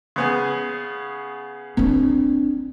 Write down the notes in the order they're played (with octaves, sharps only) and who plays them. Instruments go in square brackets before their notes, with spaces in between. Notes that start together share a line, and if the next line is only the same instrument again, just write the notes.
[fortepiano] C#3 B3 G#4
[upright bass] C4 D4